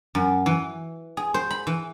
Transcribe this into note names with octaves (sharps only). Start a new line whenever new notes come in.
F#2
E3
G#4
C5
B5
E3